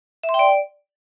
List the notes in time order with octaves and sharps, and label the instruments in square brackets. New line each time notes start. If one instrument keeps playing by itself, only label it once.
[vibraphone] E5
C6
G5
D5